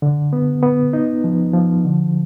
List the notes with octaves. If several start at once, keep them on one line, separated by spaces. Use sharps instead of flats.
D3
B3
B3
D#4
F3
F3
D3